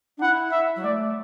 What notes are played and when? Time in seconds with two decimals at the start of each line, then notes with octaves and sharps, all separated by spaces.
0.17 D4
0.21 E4 F#5
0.52 E5
0.75 F#3
0.83 A3 D5